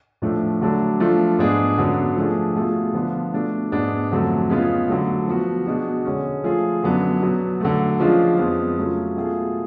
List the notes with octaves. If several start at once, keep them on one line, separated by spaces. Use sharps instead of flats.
A2 F3 A3 D4
D3 F#3 A3 D4
F3 A3 D4 F4
G#2 G#3 B3 D4 G#4
F#2 D3 F#3 B3
F3 A3 D4 G#4
B2 A3 F4 G#4
D3 F3 B3 D4 F4
B2 A3 D4 F#4
G#2 G#3 B3 D4
F2 D3 F#3 A3
C#3 G#3 B3 F4
D3 F#3 A3
F3 B3 F#4
B2 G#3 D4 F#4
D3 G#3 C#4
F3 A3 F4 G#4
F#2 D3 F#3 B3 D4
B2 F#3 B3
D3 F#3 A3
C#3 F3 G#3 D4 F4
F2 F3 G#3 B3
C#3 F#3 A3 F4
B2 A3 F4 G#4